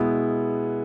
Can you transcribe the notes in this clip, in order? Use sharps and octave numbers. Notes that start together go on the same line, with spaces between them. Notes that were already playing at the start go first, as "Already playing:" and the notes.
Already playing: B2 G#3 B3 E4